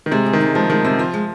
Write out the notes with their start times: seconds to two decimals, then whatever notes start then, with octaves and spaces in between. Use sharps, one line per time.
0.06 D#3
0.11 C3 G#3
0.26 G#4
0.33 D#3
0.41 D#4
0.55 F3 G#3
0.70 D#3 G#3
0.84 C3 C4
0.99 F3 F4
1.14 G#3